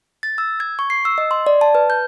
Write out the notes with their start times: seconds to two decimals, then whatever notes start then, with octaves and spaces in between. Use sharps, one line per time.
0.23 A6
0.38 E6
0.60 G#6
0.79 C#6
0.90 C7
1.05 E6
1.18 D#5
1.31 C6
1.47 D5
1.61 A5
1.75 B4
1.90 G6